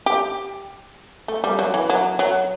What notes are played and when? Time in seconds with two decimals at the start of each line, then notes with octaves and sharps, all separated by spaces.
0.06 G4
1.28 A3
1.44 G3
1.59 F#3
1.74 E3
1.89 F#3
2.19 F#3